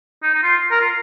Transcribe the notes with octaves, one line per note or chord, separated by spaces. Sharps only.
D#4
D#4
F4
A#4
F4